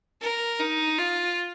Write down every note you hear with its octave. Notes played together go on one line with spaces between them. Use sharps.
A#4
D#4
F4